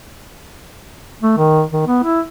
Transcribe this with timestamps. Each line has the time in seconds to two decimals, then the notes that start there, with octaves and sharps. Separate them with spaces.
1.22 A3
1.38 D#3
1.73 D#3
1.87 B3
2.04 E4